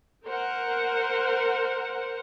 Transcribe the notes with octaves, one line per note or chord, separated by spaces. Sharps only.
A#4 C5 F#5